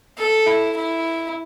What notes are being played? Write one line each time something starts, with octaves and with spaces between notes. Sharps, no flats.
A4
E4
E4